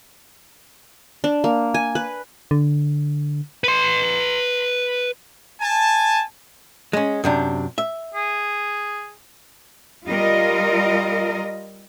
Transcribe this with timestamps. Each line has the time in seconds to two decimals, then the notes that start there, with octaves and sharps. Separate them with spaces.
1.24 D4
1.44 A#3
1.74 G#5
1.95 B4
2.51 D3
3.64 B4 C6
5.61 G#5 A5
6.93 G#3 C#4
7.24 F#2 C3 D4
7.78 E5
8.14 G#4
10.06 G3 F4 A#4 D#5